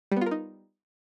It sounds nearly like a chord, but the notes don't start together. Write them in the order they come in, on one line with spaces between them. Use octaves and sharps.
G3 B3 F4 A#4 D#4